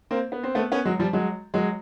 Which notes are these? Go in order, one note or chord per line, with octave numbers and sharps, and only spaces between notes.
A#3 C4
B3
C4
A3 B3
B3 C#4
F#3 G#3
F3 G3
F#3 G#3
F#3 G#3